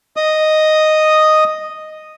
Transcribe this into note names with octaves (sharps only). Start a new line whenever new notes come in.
D#5 D#6